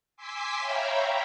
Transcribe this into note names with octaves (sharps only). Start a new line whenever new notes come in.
G#5 C6 D6 E6 B6 C7
C#5 E5 F5 G5 A#5 B5